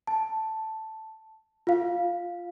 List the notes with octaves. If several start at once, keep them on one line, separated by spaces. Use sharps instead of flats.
A5
F4 F5